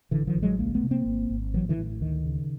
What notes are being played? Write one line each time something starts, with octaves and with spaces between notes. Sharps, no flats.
A1 D3 E3
D#3 F3
A1
F#3 G#3
C#2 G#3 A#3
A3 B3
C3
A#3 C4
G#1
G#1
A1 E3 F#3
D3 E3
A2
D2 D#3
C#3